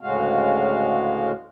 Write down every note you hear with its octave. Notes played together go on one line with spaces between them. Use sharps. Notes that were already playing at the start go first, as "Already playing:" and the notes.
D2 A2 C#3 G#3 F#4 F5